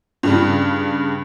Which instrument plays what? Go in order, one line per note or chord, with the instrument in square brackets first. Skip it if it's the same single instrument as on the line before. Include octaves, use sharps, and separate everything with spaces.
[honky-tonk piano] G2 C#3 G3